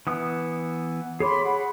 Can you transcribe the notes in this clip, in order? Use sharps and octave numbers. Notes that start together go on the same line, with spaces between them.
E3 B3 D#6
G#4 C#5 B5 C6 D6
F#5 B5